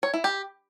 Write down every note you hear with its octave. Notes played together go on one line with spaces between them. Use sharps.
C#5
E4
G4